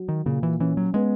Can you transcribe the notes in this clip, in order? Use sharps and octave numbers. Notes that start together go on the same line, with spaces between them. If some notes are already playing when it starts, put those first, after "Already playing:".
Already playing: F#3
D#3
A#2 C#3
E3
E3 C#4
F#3
G#3 B3